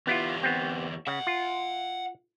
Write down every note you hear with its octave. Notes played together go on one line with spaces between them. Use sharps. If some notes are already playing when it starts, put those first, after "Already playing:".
E2 B3 E4 F4 G4
B3 C4
C#3 E5 F#5
F4